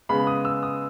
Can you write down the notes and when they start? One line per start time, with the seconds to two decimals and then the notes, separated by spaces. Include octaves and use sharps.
0.09 C#3 G#3 B3 B5
0.27 D#6
0.45 E6
0.63 D#6